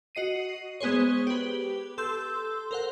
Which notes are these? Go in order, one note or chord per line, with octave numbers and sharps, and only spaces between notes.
F#4 D#5 C7 D#7
G#3 B3 G#4 C5 C#5
G4 B4
A4 C6 E6 G6
A#4 C5 F#5